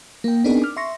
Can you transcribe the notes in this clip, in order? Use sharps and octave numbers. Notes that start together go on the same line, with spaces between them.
A#3 G5
B3 C4 D4 D#4 G#4 A#4
D6 F6
E5 C6 C#6 A#6